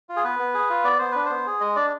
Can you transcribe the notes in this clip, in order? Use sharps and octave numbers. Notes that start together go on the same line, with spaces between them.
F4
G#4
B3 B4
B3
G#4
F4
B3 D5
B3 C5
D4 B4
B3 C5
G#4
G#3 D#5
D4 D5